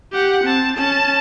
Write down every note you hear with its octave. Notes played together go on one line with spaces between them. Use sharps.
G4 F#5
C4 A5
C#4 A5